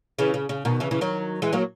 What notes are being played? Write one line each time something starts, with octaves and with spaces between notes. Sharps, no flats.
C#3 E3
C#3
C#3
B2 D#3
C#3 E3
C#3 E3
D#3 F#3
E3 G#3
F#3 A#3